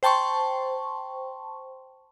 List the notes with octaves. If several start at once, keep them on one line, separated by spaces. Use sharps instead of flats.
C5 G5 A5 C6 C#6